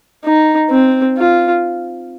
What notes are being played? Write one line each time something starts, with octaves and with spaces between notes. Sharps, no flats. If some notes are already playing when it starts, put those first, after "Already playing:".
D#4
C4
F4